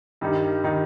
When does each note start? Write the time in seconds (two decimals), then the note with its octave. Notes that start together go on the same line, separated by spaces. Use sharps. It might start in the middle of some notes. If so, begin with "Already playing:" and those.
0.21 G2 D#3 G3 D#4
0.64 D#3 G3 D#4